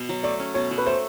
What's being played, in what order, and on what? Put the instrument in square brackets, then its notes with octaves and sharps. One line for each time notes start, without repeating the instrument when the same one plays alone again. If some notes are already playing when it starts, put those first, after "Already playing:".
Already playing: [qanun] B2
F#3
[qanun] A3 [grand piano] D5
[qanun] C#4
[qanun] B2 [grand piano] C#5
[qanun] F#3
[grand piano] B4
[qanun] A3 [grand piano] C5